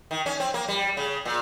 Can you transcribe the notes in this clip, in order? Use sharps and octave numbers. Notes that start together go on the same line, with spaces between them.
D#3
C#4
C4
A#3
G3
C#3
A#2